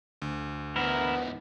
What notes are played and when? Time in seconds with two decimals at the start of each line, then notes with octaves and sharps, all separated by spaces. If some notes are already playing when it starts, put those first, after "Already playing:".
0.22 D2
0.76 E2 G#2 B3 E4 A#4